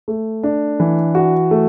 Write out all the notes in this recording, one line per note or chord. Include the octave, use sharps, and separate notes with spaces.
A3
D4
E3
F#4
A3